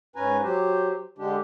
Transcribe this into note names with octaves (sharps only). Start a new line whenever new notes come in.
G#2 C#4 B4 G#5 A#5
F#3 G4 C5
D3 G#3 D4 G4